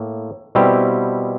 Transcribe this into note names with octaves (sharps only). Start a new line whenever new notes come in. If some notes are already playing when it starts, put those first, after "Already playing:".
Already playing: A2 A#3
B2 G3 C4 E4 G4